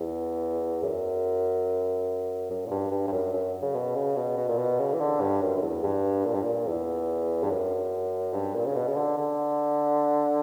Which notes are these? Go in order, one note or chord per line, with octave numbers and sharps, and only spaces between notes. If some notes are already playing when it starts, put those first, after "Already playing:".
Already playing: E2
F#2
F#2
A#2
G2
G2
G2
F#2
F#2
C#3
B2
C#3
B2
B2
A#2
B2
C#3
E3
D3
G2
F#2
F#2
E2
G2
A#2
G2
A#2
E2
G2
F#2
G2
A#2
C#3
B2
C#3
D3
D3